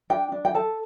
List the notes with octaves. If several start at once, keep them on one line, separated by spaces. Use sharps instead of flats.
D4 G5
D4
G5
A4 A5